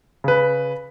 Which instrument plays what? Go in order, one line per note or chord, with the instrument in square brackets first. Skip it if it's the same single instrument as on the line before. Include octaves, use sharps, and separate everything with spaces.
[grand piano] C#3 B4